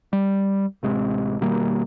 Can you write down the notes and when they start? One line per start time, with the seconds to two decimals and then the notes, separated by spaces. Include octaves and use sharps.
0.13 G3
0.83 A1 C3 G#3 C4
1.41 B2 D#3 G3 A#3